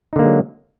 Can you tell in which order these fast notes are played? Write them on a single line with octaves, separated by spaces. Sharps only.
D#4 D3 A#3 G#3 F#3